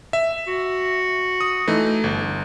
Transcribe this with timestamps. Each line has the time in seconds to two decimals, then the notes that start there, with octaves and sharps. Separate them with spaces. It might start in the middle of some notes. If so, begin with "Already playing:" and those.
0.13 E5
0.47 F#4
1.41 D#6
1.67 E3 A3 D#4
2.04 G1